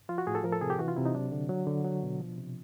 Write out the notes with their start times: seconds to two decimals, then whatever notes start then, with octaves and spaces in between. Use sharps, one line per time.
0.09 F3 F4
0.18 F#4
0.27 A2 G#4
0.35 A4
0.44 F3 A#4
0.52 A4
0.61 C3 G#4
0.70 G4
0.79 E3 F#4
0.88 F4
0.96 C3 E4
1.05 D#4
1.15 F#3 D4
1.32 D3
1.49 F#3
1.67 D3
1.84 F#3
2.03 B2
2.20 F3
2.38 C3